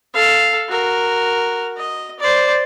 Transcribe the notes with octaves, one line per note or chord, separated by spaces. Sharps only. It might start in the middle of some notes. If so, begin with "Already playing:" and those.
A4 F5
F#4 A#4
D#5
C5 D5